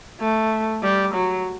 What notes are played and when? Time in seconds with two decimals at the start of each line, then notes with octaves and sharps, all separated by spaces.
0.20 A3
0.83 G3
1.14 F#3